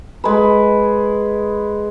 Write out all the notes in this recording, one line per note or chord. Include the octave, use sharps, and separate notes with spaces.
G#3 B4